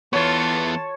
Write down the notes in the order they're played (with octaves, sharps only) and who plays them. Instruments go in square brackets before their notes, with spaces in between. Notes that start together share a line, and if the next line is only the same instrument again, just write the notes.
[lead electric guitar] E3 B3 [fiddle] F4 A4 [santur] C#5 [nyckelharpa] A5